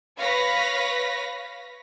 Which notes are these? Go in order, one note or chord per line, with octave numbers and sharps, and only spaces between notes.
B4 C#5 F5 A#6 B6